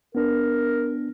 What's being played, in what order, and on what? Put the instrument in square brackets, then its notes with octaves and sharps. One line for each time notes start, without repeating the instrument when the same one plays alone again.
[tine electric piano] B3 D4 [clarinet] A#4